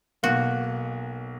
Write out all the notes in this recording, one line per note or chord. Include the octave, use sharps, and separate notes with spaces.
B1 B2 A#3 F#4